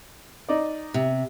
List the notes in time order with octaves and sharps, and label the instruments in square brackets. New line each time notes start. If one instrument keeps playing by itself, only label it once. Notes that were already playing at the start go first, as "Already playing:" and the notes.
[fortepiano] D#4 D5
[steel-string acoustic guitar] C3